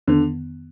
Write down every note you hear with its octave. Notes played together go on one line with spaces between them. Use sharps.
F2 D3 D#3 B3